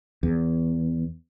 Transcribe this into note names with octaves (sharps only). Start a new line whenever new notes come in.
E2